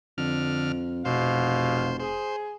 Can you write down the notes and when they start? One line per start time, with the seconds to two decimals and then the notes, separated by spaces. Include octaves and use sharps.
0.18 F2 D3 F6
1.05 F1 E2 B2 C5 F5
2.00 G#4 C5